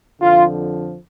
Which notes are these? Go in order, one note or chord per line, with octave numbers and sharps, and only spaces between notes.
F2 D3 F3 F4